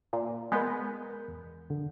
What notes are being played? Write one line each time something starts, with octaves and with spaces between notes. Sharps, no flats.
A#2
G#3 B3 A#4 G6
E2
D3